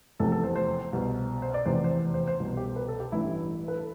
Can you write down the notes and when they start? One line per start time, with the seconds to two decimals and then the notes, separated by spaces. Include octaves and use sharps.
0.20 F1 E2 C3 E3 A4
0.32 A4
0.43 C5
0.56 C5
0.93 C2 B2
1.42 C5
1.54 D5
1.65 F1 E2 C3 E3 C5
1.84 C5
2.14 C5
2.27 C5
2.40 C2 B2
2.57 G4
2.76 B4
2.88 A4
3.00 G4
3.12 A1 G2 E3 E4
3.68 B4
3.77 A4